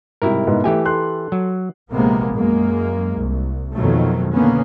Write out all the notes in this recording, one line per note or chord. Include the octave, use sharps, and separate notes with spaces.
G#2 C3 G3 E4 A#4
G#2 B2 B3
E3 A3 G4 G#5
A4 C6 F#6
F#3
A#1 C3 G#3 A#3 B3
F#2 G#3 A#3
C2
F2 B2 D#3 F3 F#3 A3
B2 D3 A#3 B3 C#4